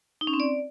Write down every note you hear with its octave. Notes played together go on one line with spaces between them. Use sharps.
D#4
C#4
C4
D5